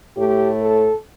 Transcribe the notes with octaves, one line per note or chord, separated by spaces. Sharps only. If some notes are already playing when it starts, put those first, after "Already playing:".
A2 A3 G4
A4